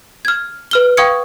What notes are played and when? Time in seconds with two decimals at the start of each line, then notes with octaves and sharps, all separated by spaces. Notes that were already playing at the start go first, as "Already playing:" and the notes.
0.25 F6 G#6
0.71 B4 F6 G7
0.97 F5 G5 C#6 D#6 G#6 C#7